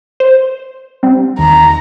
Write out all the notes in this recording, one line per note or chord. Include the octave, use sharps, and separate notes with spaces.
C5
G3 C4
D#2 A#5